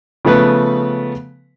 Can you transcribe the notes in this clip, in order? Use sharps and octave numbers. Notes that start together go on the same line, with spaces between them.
C#3 F3 A3 B3 B4